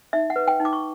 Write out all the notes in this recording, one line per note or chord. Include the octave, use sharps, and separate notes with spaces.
D#4 E5
F#5
B4
G5
D#4
D6
C#6